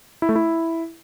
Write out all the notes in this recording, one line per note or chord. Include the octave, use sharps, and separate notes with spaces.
E4
A3
E4